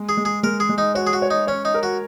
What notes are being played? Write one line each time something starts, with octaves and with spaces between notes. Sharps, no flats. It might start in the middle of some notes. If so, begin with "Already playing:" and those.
Already playing: G#3
G#4
G#3
G#4
G#3 A#4
G#4
G#3
D#4
F#4 C#5
G#4
F#4
C#5
D#4
C#4 C#5
D#4
A#4
F#4